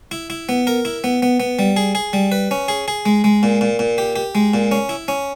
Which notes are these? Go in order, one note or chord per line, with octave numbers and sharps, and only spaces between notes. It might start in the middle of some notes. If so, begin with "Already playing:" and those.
E4
E4
B3
A#4
E4
B3
B3
B3
G3
G#4
G#4
G3
B4
C#4
G#4
G#4
G#3
G#3
A#2
A#2
A#2
G4
G4
G#3
A#2
C#4
E4
C#4